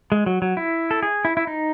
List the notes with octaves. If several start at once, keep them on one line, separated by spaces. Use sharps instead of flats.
G#3
F#3
F#3
E4
A4
G#4
E4
E4
D#4